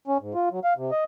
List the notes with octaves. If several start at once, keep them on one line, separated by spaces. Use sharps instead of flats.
C#4
G#2
F4
F#3
F5
C3
D#5